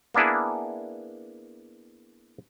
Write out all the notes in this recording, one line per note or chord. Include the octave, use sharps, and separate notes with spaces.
A#3 B3 D4 E4 G#4